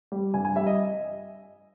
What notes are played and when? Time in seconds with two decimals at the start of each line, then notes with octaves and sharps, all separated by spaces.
0.12 G3
0.34 G2 G#5
0.45 G#5
0.56 G3 E5
0.66 D#5